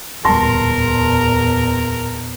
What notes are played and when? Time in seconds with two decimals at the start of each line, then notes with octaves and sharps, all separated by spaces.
0.25 D1 E2 A#2 G3 A#4 A5 C6 A#6